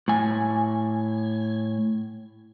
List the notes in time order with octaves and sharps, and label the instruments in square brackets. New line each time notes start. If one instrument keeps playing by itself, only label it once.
[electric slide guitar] A2 G#5